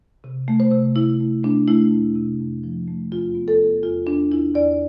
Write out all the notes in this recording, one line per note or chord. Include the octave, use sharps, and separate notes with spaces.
C3
A3
C5
C3
C3 E4
A3
A3 D4
A3 E4
F2
C3
F2
F3
A3
E2 F4
B3
A4
B3
E2 F4
E2 D4
E2 E4
E2 D5